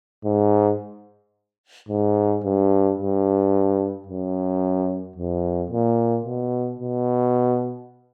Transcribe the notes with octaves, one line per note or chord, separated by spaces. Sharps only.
G#2
G#2
G2
G2
F#2
F2
A#2
B2
B2